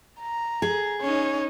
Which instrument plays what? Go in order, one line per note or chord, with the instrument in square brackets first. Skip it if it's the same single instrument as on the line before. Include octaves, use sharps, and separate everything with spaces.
[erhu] A#5
[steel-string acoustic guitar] G#4
[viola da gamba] C#4 D#4 [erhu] C#5